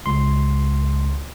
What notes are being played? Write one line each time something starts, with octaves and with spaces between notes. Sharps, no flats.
C#2 C6